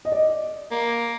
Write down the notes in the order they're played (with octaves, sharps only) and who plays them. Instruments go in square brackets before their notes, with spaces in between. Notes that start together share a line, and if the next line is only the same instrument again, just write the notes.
[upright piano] D#5
D5
[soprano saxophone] A#3